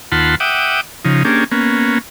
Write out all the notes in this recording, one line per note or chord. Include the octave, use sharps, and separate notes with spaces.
D#2 F4 F#5 A5 B5 C6
E5 F#5 G5 D6 D#6
C#3 F3 D#4
A#3 C#4 D4 G4 G#4
A#3 B3 C#4